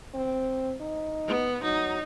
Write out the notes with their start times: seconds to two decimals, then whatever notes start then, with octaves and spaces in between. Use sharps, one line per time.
0.14 C4
0.81 D#4
1.27 B3
1.63 F#3 D#4